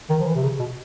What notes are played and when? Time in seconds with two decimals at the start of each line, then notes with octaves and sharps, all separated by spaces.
0.10 D#3
0.20 F3
0.26 E3
0.35 C3
0.43 C#3
0.59 B2